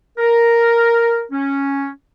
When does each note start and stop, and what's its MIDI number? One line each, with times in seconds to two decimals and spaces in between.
0.18 1.22 70
1.32 1.89 61